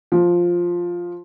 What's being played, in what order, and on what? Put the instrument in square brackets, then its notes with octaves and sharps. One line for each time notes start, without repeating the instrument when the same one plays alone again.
[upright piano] F3